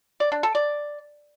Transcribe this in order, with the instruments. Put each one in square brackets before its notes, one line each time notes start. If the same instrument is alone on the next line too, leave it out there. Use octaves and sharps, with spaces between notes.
[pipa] D5
D4
A4
D5